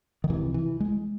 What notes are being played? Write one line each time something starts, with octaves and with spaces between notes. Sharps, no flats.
D#3
C#2 C3 E3
E3
G#3